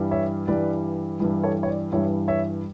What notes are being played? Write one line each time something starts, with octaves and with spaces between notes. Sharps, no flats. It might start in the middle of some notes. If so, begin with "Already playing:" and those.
Already playing: G2 E3 G3
C#5 E5
G2 E3 G3 B4 D5
G2 E3 G3
A4 C#5
C#5
B4 D5
G2 E3 G3 C#5 E5
C#5 E5